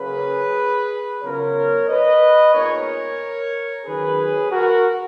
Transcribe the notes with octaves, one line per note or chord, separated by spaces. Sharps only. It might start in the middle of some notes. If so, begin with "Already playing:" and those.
Already playing: C#3 F#3 A#3 C#4 G#4 B4
C#3 F#3 B3 F4 A#4 C#5
B4 D#5
A#2 G#3 B3 D#4 A#4 C#5
D#3 F#3 C#4 G#4 B4
F#4 A#4